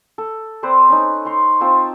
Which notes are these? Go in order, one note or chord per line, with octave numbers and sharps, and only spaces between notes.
A4
C4 B4 C5 D5
C#4 D#4
C#5 A#5 C6
C4 F4 A5